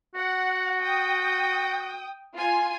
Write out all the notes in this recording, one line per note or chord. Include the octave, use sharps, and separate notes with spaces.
F#4 F#5
G5 D#6
F4 G#5